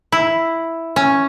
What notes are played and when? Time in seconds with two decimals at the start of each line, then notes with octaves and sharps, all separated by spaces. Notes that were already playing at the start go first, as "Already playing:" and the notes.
0.12 E4
0.96 C#4